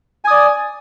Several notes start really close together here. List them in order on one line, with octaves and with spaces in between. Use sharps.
G#5 D#6 D5